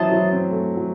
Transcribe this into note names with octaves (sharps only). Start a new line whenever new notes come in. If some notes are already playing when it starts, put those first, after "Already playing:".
Already playing: E3 F#3 E4 C5 D#5 A5
F#3
C4
A3
F#3